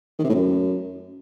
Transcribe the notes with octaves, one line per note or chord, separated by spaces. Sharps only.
D#3
C3
A2
F#2